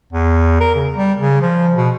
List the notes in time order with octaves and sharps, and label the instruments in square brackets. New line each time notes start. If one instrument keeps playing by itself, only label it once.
[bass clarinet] E2
A#4
C#3
G3
C#3
F3
B2